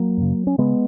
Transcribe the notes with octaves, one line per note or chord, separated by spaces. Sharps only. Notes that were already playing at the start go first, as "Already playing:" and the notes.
Already playing: F#3 A#3
F#2 C#3
C#4
C#3 G#3 B3